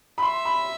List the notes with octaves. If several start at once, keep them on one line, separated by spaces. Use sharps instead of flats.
B5
E5 C6
B5